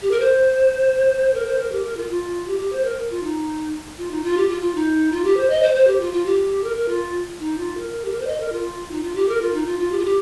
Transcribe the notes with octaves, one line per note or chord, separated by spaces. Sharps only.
G4
A#4
C5
A#4
C5
A#4
G4
A#4
F4
F4
G4
G4
C5
A#4
F4
D#4
F4
D#4
F4
G4
F4
F4
D#4
F4
G4
C5
D#5
C5
C5
G4
F4
F4
G4
A#4
A#4
F4
D#4
F4
A#4
G4
A#4
C5
D#5
A#4
F4
D#4
F4
G4
A#4
F4
D#4
F4
F4
G4
F4
G4